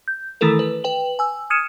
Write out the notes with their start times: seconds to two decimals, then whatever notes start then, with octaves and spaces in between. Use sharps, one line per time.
0.08 G6
0.41 D#3 E3 A3 E4 A4 A#4
0.59 B4
0.84 B4 G5 F#7
1.19 G#5 E6
1.50 D#6 F6 G#6 C#7 D#7 E7